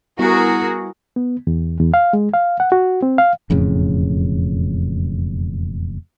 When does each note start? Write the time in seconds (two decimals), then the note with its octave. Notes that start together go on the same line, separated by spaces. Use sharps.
0.19 G3 B3 E4 F#4 G#4 A#4
1.16 B3
1.47 E2
1.80 E2
1.94 F5
2.13 G#3
2.34 F5
2.60 F#5
2.72 F#4
3.02 C4
3.18 F5
3.50 E1 F2 A2 C#3